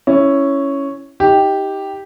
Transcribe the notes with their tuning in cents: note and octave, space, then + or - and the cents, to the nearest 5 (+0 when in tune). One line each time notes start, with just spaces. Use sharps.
C#4 +0 E4 +0
D#4 +30 G4 +0